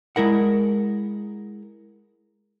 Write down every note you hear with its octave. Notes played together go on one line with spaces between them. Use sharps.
G#3 E4 A#4 F#5